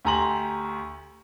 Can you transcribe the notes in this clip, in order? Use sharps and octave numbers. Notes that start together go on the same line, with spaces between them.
D2 G4 G#5 A#5 C6 F#7